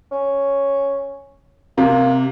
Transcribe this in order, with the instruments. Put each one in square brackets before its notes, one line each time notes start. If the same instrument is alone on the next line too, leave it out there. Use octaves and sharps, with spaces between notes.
[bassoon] C#4
[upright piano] C3 [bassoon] A#3